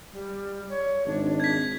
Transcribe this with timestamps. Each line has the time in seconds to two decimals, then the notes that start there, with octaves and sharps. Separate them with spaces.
0.13 G3
0.70 C#5
1.07 G#1 D4
1.40 G#6 B6